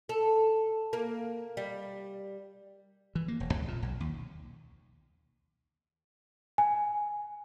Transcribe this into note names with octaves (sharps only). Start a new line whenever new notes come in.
A4
A#3
G3
E3
A#3
E1
C#2
A#2
B1
D#2
G#5